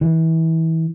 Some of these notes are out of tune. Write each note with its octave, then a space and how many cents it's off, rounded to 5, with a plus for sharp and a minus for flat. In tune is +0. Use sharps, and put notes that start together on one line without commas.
E3 -25